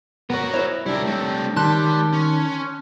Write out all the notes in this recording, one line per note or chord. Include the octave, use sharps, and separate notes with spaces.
B3 F#4 A#4 C#5
E4 C5 C#5
G3 D4 E4 G4 A#4
A3 C4
D#3 G3 A5 C6 F#6
C#4